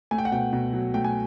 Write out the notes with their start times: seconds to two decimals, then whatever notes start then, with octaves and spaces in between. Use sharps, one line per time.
0.11 A3 G#5
0.18 G5
0.25 F#5
0.32 B2 G5
0.53 B2
0.73 F#3
0.94 A3 G5
1.04 G#5